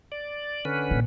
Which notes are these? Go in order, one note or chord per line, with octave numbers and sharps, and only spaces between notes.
D5
D3 C#4 B4
A#2